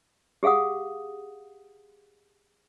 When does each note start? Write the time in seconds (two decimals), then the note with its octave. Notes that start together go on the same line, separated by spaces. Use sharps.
0.43 G4 G#4 F5 F#5 D#6